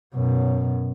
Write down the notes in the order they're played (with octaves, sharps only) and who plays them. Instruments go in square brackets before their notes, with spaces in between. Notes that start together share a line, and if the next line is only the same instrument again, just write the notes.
[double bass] F#2 B2